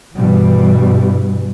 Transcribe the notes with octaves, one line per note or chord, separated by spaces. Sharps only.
G2 B2 E3 G3